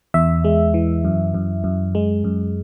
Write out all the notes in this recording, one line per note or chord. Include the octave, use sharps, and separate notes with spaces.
E2 E5
G#3
E3
F#2
F#2
F#2
G#3
F#2